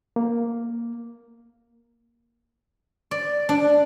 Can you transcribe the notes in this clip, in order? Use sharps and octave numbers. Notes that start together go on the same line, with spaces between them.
A#3
D5
D4